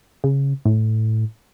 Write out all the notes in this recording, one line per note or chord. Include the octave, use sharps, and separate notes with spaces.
C#3
A2